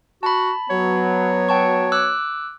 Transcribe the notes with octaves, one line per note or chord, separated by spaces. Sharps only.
F#4 A5 B5
F#3 B3 C#5
G5 A5 C#6
D6 E6 F#6